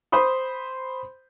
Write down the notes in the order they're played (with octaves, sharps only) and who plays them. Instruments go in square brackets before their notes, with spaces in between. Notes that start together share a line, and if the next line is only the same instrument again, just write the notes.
[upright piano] C5 B5 C6 D#6